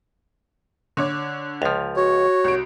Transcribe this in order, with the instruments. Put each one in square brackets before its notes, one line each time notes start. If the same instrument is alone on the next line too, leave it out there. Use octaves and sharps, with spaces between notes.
[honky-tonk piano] D3 C#5 D6
[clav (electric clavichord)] C#2 F3 [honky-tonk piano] F7
[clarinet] F#4 [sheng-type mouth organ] C#5
[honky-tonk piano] C2 D7